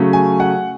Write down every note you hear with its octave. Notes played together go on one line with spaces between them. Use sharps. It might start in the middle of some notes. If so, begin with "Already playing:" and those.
Already playing: C#3 F#3 A3 C#4
G#5
F#5